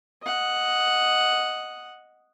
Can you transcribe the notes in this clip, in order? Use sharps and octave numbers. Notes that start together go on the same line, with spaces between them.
D#5 F#5